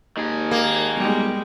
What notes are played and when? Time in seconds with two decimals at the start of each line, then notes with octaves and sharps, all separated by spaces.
0.17 D#2 D#3 G#4
0.51 A#3
0.96 B1 G3 G#3